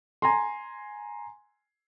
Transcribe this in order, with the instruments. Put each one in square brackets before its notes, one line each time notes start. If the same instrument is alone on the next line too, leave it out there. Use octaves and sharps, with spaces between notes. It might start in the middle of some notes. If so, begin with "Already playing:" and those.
[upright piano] G#5 A#5 C6